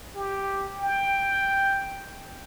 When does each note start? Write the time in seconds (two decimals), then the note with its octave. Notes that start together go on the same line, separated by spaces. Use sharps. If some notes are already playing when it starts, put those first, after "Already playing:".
0.15 G4
0.77 G5